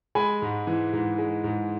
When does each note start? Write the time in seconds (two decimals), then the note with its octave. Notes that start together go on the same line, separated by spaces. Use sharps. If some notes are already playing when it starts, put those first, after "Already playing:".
0.15 G#3 G#5 B5
0.42 G#2
0.67 E3
0.93 G#2
1.18 G#3
1.44 G#2